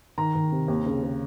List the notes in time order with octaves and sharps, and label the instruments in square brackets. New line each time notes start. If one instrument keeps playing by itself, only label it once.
[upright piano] D#3 A#5
D#3
C3
D#2
C#3
C#3